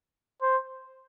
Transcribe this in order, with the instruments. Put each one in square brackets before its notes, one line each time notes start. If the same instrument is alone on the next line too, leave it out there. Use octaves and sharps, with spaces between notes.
[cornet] C5